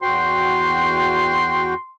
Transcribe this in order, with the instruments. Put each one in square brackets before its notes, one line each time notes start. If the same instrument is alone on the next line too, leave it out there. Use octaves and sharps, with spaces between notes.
[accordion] E2 F#4 G5 [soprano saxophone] C6